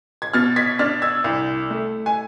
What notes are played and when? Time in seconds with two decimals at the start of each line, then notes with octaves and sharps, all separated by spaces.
0.22 G#6
0.34 B2 F6 A6
0.56 G#6 B6
0.79 D4 F6 A6
1.02 E6 G#6
1.24 C2
1.70 A3
2.06 G#5